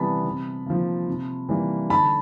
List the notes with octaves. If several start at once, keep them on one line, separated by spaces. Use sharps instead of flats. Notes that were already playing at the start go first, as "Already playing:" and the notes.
Already playing: C3 E3 G3 B3 A5 B5
C3
F3 A#3
C3
E3 G3 A#3
D3 A5 B5